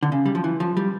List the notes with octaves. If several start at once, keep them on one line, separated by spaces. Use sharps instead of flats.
D3
C#3
G3
F3
E3
F3
G3